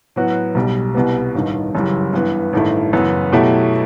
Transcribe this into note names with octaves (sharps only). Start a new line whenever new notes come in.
A2 F#3 B3 F#4
B1 B2 G3
C2 B2 G3 B3
A1 G2 D#3
F#1 F#2 E3 G3
G2 E3 B3
A1 G2 D#3 A3 E4
F#1 F#2 E3 B3
B2 F#3 A3 E4 G4